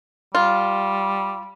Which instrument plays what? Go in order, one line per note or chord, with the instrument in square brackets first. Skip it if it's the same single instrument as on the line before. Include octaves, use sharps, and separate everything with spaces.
[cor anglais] G3 [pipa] F4